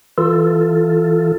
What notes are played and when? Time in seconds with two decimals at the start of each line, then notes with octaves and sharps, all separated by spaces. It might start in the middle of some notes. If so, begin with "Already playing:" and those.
0.18 E3 F4 A4